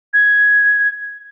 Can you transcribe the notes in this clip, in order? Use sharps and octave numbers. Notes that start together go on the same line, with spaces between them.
G#6